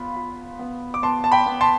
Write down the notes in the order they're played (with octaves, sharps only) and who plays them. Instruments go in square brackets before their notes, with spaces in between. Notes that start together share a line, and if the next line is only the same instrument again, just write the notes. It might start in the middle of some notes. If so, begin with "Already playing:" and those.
Already playing: [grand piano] B3 F4 B5
F4
B3
D6
B3 A5 C6
A5
G5 B5
B3
A5 C6